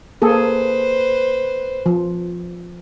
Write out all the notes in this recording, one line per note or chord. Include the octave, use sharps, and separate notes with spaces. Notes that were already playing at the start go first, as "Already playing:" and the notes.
A#3 G#4 A4 B4 C5
F3